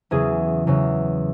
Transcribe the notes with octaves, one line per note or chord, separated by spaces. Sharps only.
E2 C#3 F#3 G#4
E2 C#3 F#3